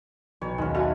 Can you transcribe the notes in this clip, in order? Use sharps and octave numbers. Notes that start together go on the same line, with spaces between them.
B1 C#5
D#2 G#3 C#4
A3 F#4 F#5 G#5 B5